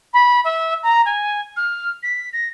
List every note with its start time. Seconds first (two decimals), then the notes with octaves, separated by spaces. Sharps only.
0.13 B5
0.44 E5
0.83 A#5
1.05 G#5
1.56 F6
2.02 B6
2.33 A#6